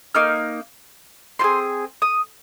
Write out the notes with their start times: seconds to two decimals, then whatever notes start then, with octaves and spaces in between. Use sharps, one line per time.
0.15 A#3 D#4 F6
1.39 C4 F4 C6
1.44 G#4
2.02 D#6